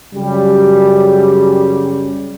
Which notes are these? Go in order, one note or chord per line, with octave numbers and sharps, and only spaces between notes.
F#2 C#3 G3